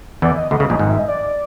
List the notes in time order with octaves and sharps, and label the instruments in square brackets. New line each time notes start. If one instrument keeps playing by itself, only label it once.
[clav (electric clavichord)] E2 E3 [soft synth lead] D5
[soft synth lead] D#5
[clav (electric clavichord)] D2 D3 [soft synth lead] D#5
[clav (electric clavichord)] C#2 C#3
A#1 A#2
G#1 G#2
[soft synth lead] E5
D#5
D5